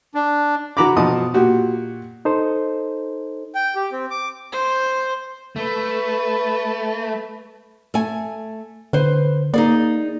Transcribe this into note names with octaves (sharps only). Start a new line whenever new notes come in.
D4
E3 F#4 A#5 B5 D6
B2 F3 A5 D#6
A#2 F#4 G4
D#4 A4 C5
G5
G4
C4
D6
C5
A3 B4
A3 G#5
D3 B4 C5
A#3 D#4 G#4 D5